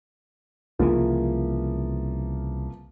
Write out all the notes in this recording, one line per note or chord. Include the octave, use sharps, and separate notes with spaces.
C2 C#3 E3 F3 A#3